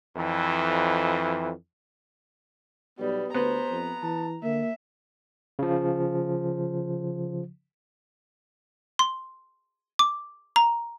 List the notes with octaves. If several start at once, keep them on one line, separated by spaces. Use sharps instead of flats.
F2 E3
B1 G3 B3
D2 B3 B4 C5 A#5
F2
E3 A5
D3 A#3 E5
C#3 F3
C6
D6
A#5